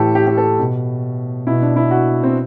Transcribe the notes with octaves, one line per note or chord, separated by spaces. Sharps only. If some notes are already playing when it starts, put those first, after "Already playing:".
Already playing: A2 E3 G4 A4
G4
G4
A4
B2
B2 E4
D4
E4
F#4
C4